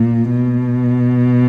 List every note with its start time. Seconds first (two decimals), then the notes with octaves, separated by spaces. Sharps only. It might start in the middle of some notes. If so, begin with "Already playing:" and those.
Already playing: A#2
0.30 B2